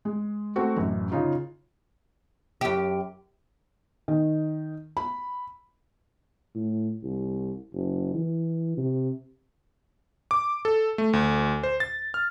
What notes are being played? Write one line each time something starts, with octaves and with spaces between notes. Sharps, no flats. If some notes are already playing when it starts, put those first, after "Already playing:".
G#3
A3 C4 F#4
A1 F#2
C#3 C#4 D#4 F4
F#2 G4
D#3
B5
A2
C2
F#1
E3
C3
D6
A4
A3
D2
C5
A6
F6